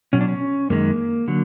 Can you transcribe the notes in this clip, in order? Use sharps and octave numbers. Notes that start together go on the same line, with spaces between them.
B2 F#3 C#4
D4
C#4
F#2 D#3 G#3 A#3
D3 F#3